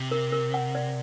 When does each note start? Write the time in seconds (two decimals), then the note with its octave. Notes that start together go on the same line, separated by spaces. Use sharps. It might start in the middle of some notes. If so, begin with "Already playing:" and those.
Already playing: C3
0.11 A#4
0.32 A#4
0.54 F#5
0.75 D5